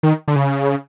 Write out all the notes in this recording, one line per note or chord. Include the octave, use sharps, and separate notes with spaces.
D#3
D3
C#3